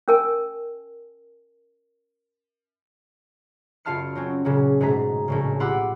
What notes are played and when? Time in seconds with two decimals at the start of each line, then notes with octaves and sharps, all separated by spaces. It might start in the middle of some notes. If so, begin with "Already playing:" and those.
0.08 C#4 A#4 G#5
3.85 F#1 F4 F5 A5 F6 C#7
4.15 F#3 C4 C#4
4.45 A#2 C#3 F#3
4.81 G#2 B2 G#3 A3 A#5 B6
5.28 A#1 A2 C#3
5.60 F4 G4 F#5 B5 D6 E6